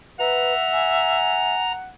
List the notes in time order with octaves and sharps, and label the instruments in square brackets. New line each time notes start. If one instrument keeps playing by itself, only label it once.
[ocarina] B4 [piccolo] E5 [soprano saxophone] F#5 [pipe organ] A#5
[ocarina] G#5